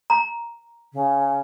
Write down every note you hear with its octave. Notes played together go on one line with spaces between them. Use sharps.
A#5
C#3